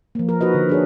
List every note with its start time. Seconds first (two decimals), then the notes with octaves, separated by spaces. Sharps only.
0.15 F3 A#3
0.29 A#4
0.41 D#4 F#4 B4 D#5
0.54 D3
0.69 D4 G#4 C#5